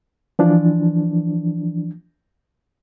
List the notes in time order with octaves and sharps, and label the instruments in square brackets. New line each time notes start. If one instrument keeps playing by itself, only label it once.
[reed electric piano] E3 F3 D4